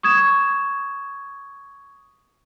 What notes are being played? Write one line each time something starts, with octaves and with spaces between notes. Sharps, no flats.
C#6 D#6 G#6 E7